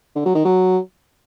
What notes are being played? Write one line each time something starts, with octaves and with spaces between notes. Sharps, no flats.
D3
F#3
D#3
F#3